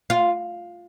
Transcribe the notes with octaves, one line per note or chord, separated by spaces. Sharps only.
F4